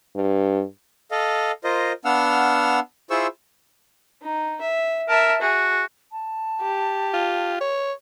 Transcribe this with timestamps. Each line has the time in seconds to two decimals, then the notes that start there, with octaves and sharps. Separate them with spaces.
0.15 G2
1.11 A4 D#5 F5
1.64 F4 A#4 C5 D#5
2.05 B3 D4 F5 F#5 E6 F6
3.10 E4 F4 G#4 C5 C#6 E6
4.22 D#4
4.61 E5
5.09 A#4 E5 A5
5.42 F#4 G#4
6.12 A5
6.62 G4
7.14 F4
7.61 C#5